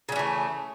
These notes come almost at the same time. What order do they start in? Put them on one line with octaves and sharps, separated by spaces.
C#3 G3 E3 A3